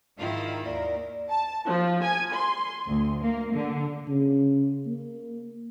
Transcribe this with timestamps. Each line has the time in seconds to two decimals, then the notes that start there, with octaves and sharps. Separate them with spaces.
0.18 G#2 D#3 E4 F4
0.66 D#2 A#4 D5
1.29 A5
1.66 F3
2.03 G#5
2.33 C6
2.87 D2
3.22 A#3
3.53 D3
4.08 C#3
4.86 A#3